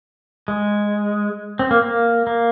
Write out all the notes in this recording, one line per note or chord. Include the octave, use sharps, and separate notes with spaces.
G#3
C4
A#3
A#3
A#3